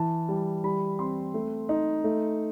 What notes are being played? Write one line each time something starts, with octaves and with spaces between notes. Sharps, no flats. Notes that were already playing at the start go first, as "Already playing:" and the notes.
Already playing: E3 A5
G3
G3 B5
C4 C6
A3
D#4
A3